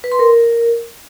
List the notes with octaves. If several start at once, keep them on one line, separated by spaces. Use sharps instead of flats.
B4
C6
A#4